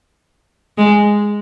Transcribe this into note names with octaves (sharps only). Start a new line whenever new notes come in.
G#3